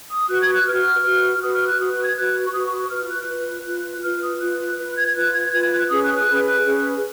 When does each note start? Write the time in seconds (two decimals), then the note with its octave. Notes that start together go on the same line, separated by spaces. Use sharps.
0.10 D#6
0.29 F#4 B4 F#6
0.42 G#6
0.54 F#6
0.66 F#4 B4 F6
1.04 F#4 B4
1.35 F6
1.41 F#4 B4 D#6
1.54 F6
1.66 F#6
1.79 F#4 B4 D#6
1.92 F#6
2.03 G#6
2.16 F#4 B4 F#6
2.45 C#6
2.53 F#4 B4 D#6
2.66 C#6
2.78 C#6
2.90 F4 B4 F6
3.09 F#6
3.29 F4 B4
3.66 F4 B4
4.03 F4 B4 F6
4.21 D#6
4.40 F4 B4 F#6
4.59 F#6
4.77 F4 B4 F#6
4.92 F#6
4.96 G#6
5.08 G#6
5.15 F4 B4 F#6
5.33 G#6
5.52 F4 B4 G#6
5.71 F#6
5.89 C#4 G#4 B4 D#6
6.02 F#6
6.15 F#6
6.27 C#4 G#4 B4
6.65 C#4 G#4 B4